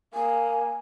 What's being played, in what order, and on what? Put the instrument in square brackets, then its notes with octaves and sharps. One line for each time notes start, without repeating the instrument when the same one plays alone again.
[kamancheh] A#3 [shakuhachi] G#5